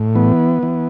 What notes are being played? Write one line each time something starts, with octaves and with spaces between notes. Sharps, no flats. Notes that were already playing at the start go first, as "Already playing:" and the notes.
Already playing: A2
E3 B3
E3